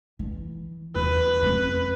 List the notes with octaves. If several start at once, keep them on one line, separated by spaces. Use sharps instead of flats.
E3
E2 B4
F2 C#4